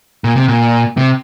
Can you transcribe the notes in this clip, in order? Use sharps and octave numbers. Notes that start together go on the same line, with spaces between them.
A#2
C3
A#2
C3